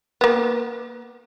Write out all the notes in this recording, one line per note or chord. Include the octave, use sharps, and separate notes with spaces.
A#3 B3